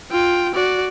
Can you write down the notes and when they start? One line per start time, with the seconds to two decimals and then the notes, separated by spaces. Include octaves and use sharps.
0.10 F4 G5
0.55 F#4 D5